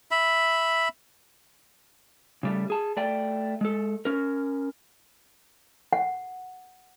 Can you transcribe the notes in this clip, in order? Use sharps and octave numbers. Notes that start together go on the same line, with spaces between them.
E5 B5
C#3 G3 A3
G#4 A5
A3 D5 G5
G#3 A4
C#4 A#4
F#5